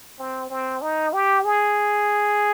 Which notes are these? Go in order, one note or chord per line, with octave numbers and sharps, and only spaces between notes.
C4
C4
D#4
G4
G#4